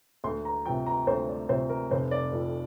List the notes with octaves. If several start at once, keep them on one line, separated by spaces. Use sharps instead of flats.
D2 C6
A#5
C3 F3 G5
A#5
D2 C5
D5
C3 F3 C5
A#4
F1 C5
D5
F2 F3